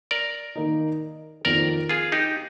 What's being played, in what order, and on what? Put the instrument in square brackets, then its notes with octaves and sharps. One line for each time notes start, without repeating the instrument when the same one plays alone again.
[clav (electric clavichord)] A#4 D5
[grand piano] D#3 A#3 D#4
[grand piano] F2 D#3 A#3 [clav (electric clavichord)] A#4 D5
[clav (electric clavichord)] F4 G#4
D#4 G4